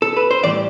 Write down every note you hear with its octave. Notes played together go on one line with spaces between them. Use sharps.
A4
B4
C5
A2 E3 G3 D5